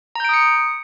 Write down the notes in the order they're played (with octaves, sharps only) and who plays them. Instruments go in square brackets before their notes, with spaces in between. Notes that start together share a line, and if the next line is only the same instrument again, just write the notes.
[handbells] A#5
G6
D7
D#6
C#7